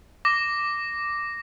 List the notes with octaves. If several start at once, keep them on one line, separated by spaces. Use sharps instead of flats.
D6 A#6